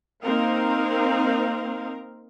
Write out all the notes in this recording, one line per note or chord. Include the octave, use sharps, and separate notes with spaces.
A#3 C4 D#4 A#4 F5